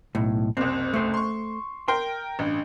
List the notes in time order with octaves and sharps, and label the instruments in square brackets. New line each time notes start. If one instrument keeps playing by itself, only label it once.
[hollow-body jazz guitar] B1 A2
[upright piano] F#1 C2 [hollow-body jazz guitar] C4
[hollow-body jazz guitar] A3 C5
[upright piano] C6 C#6
[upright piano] A#4 G5 G7 [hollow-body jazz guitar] C6
[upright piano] A1 G2